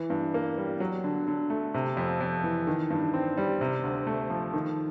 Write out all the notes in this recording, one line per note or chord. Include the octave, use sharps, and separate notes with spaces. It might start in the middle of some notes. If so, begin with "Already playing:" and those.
Already playing: E3
G2
A#3
G3
F#3
D3
D3
A3
C3
F2
F2
E3
D#3
G2
C4
G3
C3
D2
A3
F3
D#3